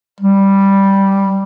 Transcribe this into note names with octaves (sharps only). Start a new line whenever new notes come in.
G3